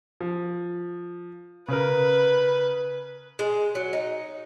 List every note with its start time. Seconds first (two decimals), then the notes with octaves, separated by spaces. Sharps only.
0.21 F3
1.68 C#3 A#4 B4
3.39 G#3
3.75 F#3
3.93 D#4